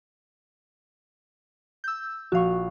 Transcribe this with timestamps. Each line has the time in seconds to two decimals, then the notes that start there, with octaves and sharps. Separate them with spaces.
1.84 E6 G6
2.32 A#1 F#4 F5 C#6